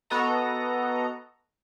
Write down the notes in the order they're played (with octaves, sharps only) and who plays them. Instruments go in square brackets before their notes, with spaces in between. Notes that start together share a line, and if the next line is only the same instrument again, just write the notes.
[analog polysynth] B3 F#4 A4 D#5 A#5